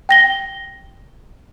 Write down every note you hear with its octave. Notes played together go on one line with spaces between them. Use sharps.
G5 A#6 G7